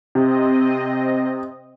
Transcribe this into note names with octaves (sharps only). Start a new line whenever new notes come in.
C3 C4 D#5